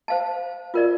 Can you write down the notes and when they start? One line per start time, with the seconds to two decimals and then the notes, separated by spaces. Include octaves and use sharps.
0.08 C5 F5 A5
0.74 F4 A#4 D5